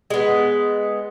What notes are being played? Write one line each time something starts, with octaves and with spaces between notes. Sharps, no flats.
G#3 B3